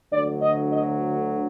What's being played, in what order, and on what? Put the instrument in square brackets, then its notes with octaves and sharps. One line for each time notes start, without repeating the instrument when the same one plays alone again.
[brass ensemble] D2 D3 F#3 D5
D#5
D#5